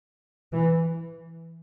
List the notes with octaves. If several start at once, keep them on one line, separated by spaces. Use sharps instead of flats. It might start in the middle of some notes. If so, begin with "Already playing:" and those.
E3